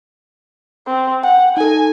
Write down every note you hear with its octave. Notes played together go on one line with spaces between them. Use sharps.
C4
F#5 G5
D#4 A4 G#5